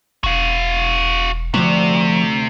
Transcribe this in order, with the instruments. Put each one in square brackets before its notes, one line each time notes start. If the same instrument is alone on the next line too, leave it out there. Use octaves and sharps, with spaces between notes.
[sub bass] E1 [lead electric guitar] F#4 F5
[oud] D2 F#4 [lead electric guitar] C3 [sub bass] F3